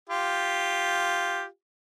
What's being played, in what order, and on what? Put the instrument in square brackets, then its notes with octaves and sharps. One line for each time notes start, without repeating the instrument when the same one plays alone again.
[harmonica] F4 G4